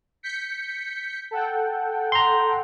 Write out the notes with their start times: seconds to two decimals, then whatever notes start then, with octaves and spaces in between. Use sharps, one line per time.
0.23 G6 B6 C#7
1.31 A4 F#5 G5
2.12 A#5 C6